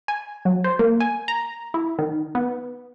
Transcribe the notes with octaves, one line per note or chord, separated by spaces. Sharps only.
G#5
F#3
C5
A#3
G#5
A#5
E4
D#3
B3